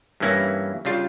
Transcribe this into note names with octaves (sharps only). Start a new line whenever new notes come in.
G2 E3 A#3 C#4 E4
C#3 G3 D4 F4